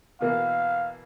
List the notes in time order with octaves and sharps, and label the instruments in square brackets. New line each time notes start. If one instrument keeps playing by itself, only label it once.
[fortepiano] B2 E3 A#3 [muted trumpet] F5